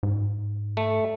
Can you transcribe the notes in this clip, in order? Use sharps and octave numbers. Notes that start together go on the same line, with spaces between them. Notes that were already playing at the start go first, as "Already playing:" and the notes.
G#2
A3